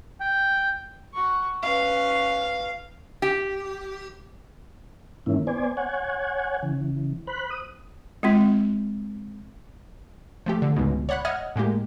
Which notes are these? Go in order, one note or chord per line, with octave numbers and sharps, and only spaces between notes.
G5
F#4 C#6
C#4 B4 F5
G4
G#2 D#3 E3 A#3 C#4 E4
B3 C5 D5 G#5
C#5 F#5 G#5
C#3 E3
C5 B5 F#6
D#6
G#3 C4 F4
F3 A3 G4
D3
C#2 G#2 B2
C#5 D5 F#5 B5 F#6
D#5 E5 F#5 D#6 F6 G#6
A2 G#3 A#3 G4